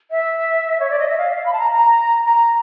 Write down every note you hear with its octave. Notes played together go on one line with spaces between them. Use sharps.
E5
C#5
D5
D#5
E5
F5
F5
B5
A5
A#5
A#5
A#5